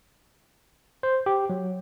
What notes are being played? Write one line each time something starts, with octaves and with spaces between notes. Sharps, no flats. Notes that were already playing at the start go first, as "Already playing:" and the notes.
C5
G4
F#3